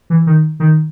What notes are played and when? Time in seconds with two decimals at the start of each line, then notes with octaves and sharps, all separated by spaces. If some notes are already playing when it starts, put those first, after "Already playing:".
0.10 E3
0.27 D#3
0.60 D#3